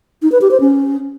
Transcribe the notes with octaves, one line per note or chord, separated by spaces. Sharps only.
D#4
B4
G4
C5
C#4